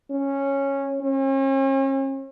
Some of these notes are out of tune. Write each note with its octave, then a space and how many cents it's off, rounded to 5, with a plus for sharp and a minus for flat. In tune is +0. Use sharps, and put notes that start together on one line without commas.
C#4 -10
C#4 -40